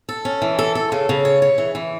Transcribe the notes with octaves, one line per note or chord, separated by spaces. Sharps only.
A4
C#4
E3
A4
A4
C#3
C#3
C#5
C#5
E3
E3